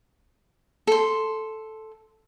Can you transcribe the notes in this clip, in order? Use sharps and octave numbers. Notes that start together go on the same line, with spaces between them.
A4 C6